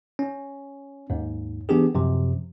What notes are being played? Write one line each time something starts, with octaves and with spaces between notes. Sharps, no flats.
C#4
D#2 G#2
E3 B3 D4 G4 G#4
F#2 C3 F3